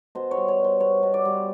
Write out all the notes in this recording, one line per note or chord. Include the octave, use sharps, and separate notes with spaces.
B2 C5
C#5
G3
C#5
B2
C5
B3 C#5
B2
D5
G3